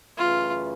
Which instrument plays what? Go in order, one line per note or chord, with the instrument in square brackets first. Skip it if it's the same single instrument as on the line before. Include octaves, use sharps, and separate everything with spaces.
[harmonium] F#2 C#3 E3 A3 [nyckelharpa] F4